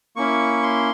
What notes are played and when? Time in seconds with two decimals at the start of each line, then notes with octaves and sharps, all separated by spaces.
0.16 A#3 C#4 E4 C#6
0.63 C6